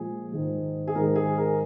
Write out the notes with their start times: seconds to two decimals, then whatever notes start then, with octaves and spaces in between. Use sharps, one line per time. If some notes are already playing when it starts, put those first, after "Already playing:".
Already playing: A#2 F3 G#3 G#4
0.32 G#2 D#3 G#3
0.88 G#4
0.95 G#2 D#3 G#3 A#4
1.16 G#4
1.37 A#4